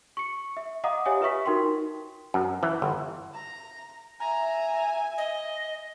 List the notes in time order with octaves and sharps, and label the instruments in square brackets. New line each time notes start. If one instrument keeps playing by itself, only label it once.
[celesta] C#6 C#7
E5
D#5 F5 F#5 A#5 D6 D#6
G4 C#5 E5 G#5 D#6
F4 B4 E5 C#6 B6
D#4 F#4 A#4 G5 C6
[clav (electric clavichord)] F#2
E3
G1
[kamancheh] A#5
[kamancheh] E5 G#5 [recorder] A#5
[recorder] D#5